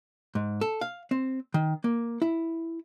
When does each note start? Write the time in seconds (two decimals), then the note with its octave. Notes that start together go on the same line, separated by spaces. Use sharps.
0.35 G#2
0.61 A4
0.81 F5
1.11 C4
1.54 D#3
1.84 A#3
2.22 E4